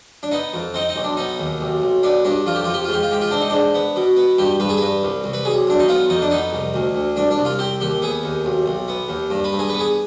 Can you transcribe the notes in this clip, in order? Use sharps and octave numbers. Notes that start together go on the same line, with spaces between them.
D4
B3 D#4
F2
C4 D#4
D#4
B1
D4
B3 D#4
D#2
B1
B1
B3 D4
G2 D4
F2 F4
G4
F2 F4
G4
F4
G#2 G4
F4
G#2 G4
F4
C4 D4
D#4
G#2 D4
B3
B2
B3
G2 G4
G2 B4
G#4
G2 B4
C2
C2
B4
B1 G#4
B1 D4
D#4
B3 F4
F2 D#4
D4
B3 D#4
C2
D2
D2
C2 D4
D4
C2
F4
C4 G4
D#2 G4
B3 G#4
D#2
B1
B1
B3
D#2
G2
B4
G2
G#4
B3 B4
G#4